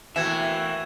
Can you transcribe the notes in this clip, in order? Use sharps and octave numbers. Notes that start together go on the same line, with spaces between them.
E3 A3 A#3 F#4 E5 G5 G#6 E7